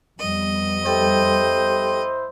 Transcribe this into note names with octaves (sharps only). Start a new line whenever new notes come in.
F2 G3 B3 D#5
E4 G4 A4 C5 G5